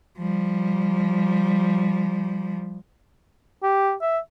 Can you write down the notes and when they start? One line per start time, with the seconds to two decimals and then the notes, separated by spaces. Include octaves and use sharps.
0.18 F3 G3
3.63 G4
4.02 E5